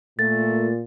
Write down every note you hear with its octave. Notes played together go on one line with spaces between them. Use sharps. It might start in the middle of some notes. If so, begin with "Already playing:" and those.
A#2 A3 A6